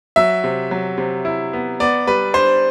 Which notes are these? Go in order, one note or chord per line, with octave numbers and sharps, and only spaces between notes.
F#3 E5
C3
F#3
C3
E4
B3
B3 D5
G3 B4
D4 C5